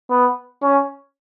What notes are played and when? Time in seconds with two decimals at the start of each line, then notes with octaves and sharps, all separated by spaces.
0.10 B3
0.62 C#4